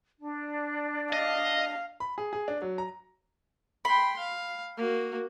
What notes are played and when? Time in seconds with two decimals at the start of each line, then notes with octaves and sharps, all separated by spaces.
0.19 D4
1.13 D#5 F5
2.00 B5
2.18 G#4
2.33 G#4
2.48 D4
2.62 F#3
2.78 A#5
3.85 G5 B5 C6
4.19 F5
4.77 A#3 F#4